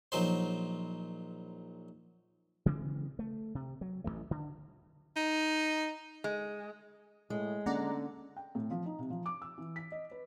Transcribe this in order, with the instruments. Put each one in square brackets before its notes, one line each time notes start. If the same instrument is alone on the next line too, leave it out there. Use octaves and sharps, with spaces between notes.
[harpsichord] A#1 F#3 D#4 C5
[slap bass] C#3 E3 G#3 C4
A3
C3
F#3
A1 D#3 E3 A3
D3
[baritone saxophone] D#4
[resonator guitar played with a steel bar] G#3
[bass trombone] A2 [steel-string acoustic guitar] G#3
[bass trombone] D3 [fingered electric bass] A#3 C#4 [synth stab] D5 F#5 A#5
[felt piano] G5
A2
F3
D#4
C3
F3
D6
E6
E3
B6
D#5
B4